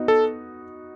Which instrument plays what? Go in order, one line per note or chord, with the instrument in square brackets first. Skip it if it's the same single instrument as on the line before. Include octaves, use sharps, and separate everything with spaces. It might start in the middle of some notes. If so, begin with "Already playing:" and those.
Already playing: [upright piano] B3 D#4 F#4
[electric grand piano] A4